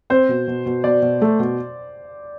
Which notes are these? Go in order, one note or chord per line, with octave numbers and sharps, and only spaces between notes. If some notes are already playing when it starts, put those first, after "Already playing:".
C4 C5
B2
B2
B2
B2 D5
B2
A3
B2